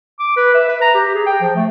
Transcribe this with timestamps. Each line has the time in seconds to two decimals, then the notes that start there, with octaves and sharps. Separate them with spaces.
0.19 D6
0.37 B4
0.55 E5
0.69 B4
0.82 A#5
0.94 G4
1.15 G#4
1.26 G5
1.41 F3
1.56 A3